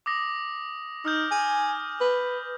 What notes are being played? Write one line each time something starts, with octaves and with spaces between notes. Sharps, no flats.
D6 D#6 A#6
D#4 D#6 F6 G6
G#5
B4